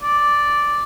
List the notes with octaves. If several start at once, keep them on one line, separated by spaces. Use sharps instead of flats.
D5